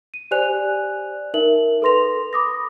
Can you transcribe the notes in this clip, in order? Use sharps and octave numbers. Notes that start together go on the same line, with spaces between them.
D#7
G4 C5 D5 G#5 F#6 F7
D#4 A#4 E5 F#7
A4 B4 C6 A#6 F7
B5 D6 D#6 A#6